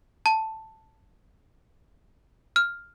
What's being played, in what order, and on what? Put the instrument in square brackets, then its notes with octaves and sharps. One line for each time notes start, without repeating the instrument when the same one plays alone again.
[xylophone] A5
F6